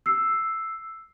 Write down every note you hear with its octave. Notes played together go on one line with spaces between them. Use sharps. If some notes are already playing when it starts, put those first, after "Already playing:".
E6 C7